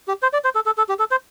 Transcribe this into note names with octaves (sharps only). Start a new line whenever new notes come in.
G4
C5
D5
C5
A4
A4
A4
G4
A4
C5